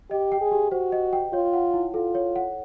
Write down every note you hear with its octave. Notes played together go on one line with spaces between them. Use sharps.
G4 D#5
G5
G#4
G4
F#4 C5
D#5
G5
F4 C#5
F#5
E4
F4 A4
C#5
F#5